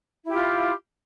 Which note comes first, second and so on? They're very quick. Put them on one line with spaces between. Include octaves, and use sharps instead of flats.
E4 G4 F4